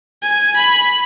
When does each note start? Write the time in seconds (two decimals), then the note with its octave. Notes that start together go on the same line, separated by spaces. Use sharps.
0.23 G#5
0.56 B5